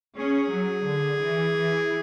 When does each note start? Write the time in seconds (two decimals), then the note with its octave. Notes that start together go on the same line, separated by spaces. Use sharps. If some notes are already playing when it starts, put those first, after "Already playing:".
0.17 C#4 G#4
0.52 F#3
0.87 D3
1.22 E3
1.58 E3